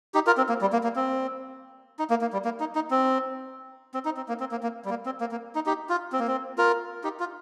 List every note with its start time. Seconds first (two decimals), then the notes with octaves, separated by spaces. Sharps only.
0.14 D#4 G4
0.27 F4 A#4
0.37 C4
0.49 A#3
0.61 G3
0.73 A#3
0.83 A#3
0.96 C4
1.99 D#4
2.10 A#3
2.21 A#3
2.33 G3
2.45 A#3
2.60 D#4
2.75 D#4
2.91 C4
3.94 C4
4.05 D#4
4.17 C4
4.29 A#3
4.40 C4
4.51 A#3
4.63 A#3
4.85 G3
4.90 A#3
5.06 C4
5.21 A#3
5.31 A#3
5.55 D#4
5.66 D#4 G4
5.89 F4
6.12 C4
6.20 A#3
6.27 C4
6.58 F4 A#4
7.04 D#4 G4
7.20 F4